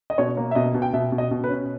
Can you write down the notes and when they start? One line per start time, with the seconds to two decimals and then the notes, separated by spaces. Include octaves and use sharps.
0.10 D#5
0.18 B2 C#5
0.37 A#3
0.51 E5
0.55 B2 D#5
0.74 B2
0.82 G5
0.94 B2 E5
1.12 B2
1.18 D#5
1.31 B2
1.44 B4
1.49 C#4